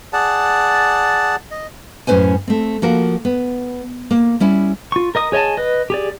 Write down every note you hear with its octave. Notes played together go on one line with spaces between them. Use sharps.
G#4 D5 F#5 A5
D#5
F#2 A2 C#4 B4 C5 G#5
A3 C4
F3 A#3 F#4 A#4
B3
A#3
G3 C#4 E4
F4 C#6
A#4 D#5 D#6
G#4 C#5 D#5 G#5 A5
B4 D#5
G4 G#4 D5